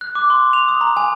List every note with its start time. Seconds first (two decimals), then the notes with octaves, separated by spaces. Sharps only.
0.01 F#6
0.15 D6
0.30 C6
0.53 F7
0.68 D#6
0.81 A#5
0.97 G#5